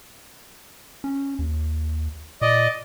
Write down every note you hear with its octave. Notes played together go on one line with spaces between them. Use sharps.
C#4
D#2
A#2 D5 D#5